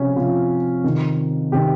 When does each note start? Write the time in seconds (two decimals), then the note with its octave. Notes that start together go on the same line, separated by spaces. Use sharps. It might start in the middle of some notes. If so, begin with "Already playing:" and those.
Already playing: C3 F3 C#4
0.16 C3 F3 F4
0.84 C3 D#3
1.52 C3 D#3 G4